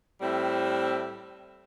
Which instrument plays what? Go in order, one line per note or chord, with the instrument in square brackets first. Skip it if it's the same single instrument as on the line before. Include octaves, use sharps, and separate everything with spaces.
[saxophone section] A2 G3 C4 E4